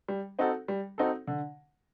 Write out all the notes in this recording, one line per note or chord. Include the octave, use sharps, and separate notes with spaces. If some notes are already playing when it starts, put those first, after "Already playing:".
G3
C4 D#4 F#4 A4
G3
C4 D#4 F#4 A4
D3